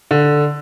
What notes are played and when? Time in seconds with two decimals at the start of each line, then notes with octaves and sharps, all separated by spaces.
0.11 D3